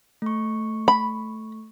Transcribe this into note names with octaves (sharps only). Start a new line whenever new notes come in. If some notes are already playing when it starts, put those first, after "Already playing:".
A3 C#6
B5